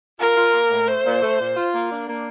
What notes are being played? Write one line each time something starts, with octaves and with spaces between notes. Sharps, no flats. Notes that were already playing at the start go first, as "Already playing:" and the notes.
F4 A#4
F4
A#3
A2
A3 C5
A#2
A3
A#2
F4
A#3
D4
A#3